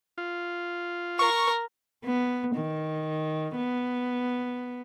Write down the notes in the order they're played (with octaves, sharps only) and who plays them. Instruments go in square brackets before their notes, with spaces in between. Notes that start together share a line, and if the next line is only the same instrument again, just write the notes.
[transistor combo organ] F4
[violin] A#4 [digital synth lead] C#6
[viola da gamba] B3
D#3
B3